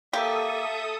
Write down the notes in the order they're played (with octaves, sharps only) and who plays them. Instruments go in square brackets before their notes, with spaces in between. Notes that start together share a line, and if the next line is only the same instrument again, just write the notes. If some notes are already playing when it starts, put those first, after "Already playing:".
[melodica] A#3 [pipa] G4 [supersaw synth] A4 D#6 [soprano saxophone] E5